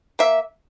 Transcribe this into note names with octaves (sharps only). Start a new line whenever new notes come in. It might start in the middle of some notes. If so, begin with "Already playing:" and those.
A#3 E5